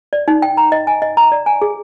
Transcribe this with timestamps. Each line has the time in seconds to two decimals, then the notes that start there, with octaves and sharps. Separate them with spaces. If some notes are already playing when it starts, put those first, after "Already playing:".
0.13 D5
0.28 D#4
0.42 G5
0.57 A#5
0.72 D#5
0.87 G#5
1.02 D#5
1.17 A#5
1.32 D5
1.46 G#5
1.62 G#4